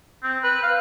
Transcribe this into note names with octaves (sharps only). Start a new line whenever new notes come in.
C4
B4
F5